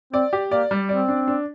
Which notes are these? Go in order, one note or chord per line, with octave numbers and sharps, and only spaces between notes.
C4 D5
G4
A#3 D5
G3
C4 D5
D4
D4